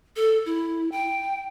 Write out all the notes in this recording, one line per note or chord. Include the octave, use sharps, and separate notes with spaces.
A4
E4
G5